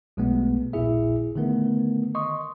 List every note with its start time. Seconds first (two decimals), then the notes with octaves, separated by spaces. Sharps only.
0.17 B1 B2 G#3 A3 B3
0.73 A#1 D#2 A#2 E4 G#4 E5
1.36 D3 D#3 A3 B3 A#4
2.15 D#5 C6 C#6 D#6